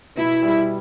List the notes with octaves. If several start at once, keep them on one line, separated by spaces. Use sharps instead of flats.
B2 E4
G3